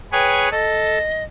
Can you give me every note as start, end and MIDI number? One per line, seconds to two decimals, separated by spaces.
0.12 0.49 68
0.12 0.49 71
0.12 0.49 73
0.12 0.48 79
0.51 0.98 69
0.51 1.24 75